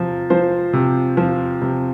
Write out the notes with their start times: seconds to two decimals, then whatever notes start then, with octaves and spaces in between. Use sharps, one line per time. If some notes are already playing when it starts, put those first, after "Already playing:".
Already playing: C3 F3
0.30 F3 C5
0.73 C3
1.17 F3
1.62 C3